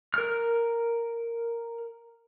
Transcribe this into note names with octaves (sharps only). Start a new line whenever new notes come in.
A#4 F6